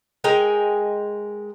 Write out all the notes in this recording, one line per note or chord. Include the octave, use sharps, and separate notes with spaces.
G#3 A#4 G5 G#5